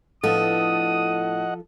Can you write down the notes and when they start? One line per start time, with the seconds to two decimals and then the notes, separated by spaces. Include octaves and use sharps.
0.23 A2 F3 B3 D4 A4 D#5 F#5 D#6